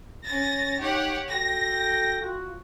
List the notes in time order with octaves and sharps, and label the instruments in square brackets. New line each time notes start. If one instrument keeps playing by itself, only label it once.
[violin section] C#4 A6 A#6
[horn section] D#4 G5 [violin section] G4 C#5 F#5
[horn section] F#4 A4 G5 [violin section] A#6
[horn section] F4 F#4